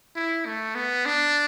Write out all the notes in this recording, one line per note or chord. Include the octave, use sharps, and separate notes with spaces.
E4
A3
B3
D4